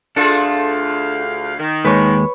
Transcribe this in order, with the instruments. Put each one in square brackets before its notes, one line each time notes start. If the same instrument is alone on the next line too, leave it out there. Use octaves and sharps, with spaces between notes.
[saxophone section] D2 F5 [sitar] A3 F4 G#4 [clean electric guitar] D4 A4
[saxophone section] D#3
[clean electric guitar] D#2 G#3 [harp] B4 C#5 C#6